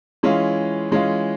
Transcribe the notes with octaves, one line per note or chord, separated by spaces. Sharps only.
E3 G#3 C#4 F4
E3 G#3 C#4 F4